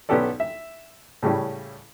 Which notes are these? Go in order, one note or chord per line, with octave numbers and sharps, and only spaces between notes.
B1 B3 C#4 G4 A4 D5
E5
A2 C#3 G3 C#4 E4